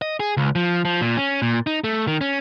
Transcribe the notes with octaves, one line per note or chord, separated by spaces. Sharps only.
D#5
G#4
C#2
F3
F3
A#2
C#4
A#2
D#4
A3
D#3
C#4